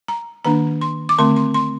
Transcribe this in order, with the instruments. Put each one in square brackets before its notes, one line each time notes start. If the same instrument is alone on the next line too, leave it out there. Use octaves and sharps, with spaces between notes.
[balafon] A#5
D#3 A#3 D4 A#5
C6
D6
D3 A3 C4 C6
C6
C6